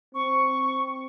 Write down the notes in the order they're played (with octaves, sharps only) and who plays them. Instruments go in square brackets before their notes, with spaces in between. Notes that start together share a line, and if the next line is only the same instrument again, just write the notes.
[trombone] C4 [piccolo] C#6